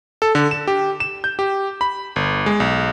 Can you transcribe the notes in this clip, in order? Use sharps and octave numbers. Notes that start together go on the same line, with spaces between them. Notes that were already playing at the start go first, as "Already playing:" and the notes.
A4
D3
E7
G4
E7
G6
G4
B5
G1
G#3
B1